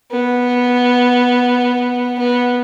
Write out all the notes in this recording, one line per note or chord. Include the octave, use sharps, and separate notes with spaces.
B3
B3